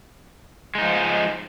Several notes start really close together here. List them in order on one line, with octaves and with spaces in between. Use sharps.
G#3 D#4 F3